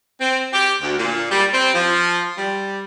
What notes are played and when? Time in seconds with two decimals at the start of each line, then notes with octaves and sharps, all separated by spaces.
0.20 C4
0.53 G4
0.82 D2
0.98 A#2
1.31 G3
1.54 C4
1.74 F3
2.37 G3